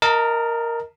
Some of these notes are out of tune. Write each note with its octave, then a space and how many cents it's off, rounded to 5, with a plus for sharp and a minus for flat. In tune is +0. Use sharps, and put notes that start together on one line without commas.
A#4 +0 D#5 +10 A5 +35